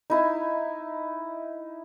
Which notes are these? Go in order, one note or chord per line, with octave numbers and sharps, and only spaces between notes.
D#4 E4 E5